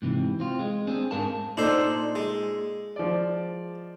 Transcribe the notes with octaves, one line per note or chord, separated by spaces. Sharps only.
G#2 C3 E3
C4 F4
G#3
C4 D4 G#4
G#2 A#4 F5 A5
A#2 D4 D#4 A4 C5
G#3
F3 D5